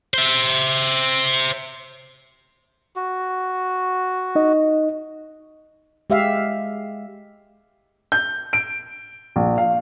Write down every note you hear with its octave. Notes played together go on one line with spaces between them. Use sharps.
C5 E5
F#4
D#4 D#5
G#3 G4 E5 F5
G6
D7
A#1
F5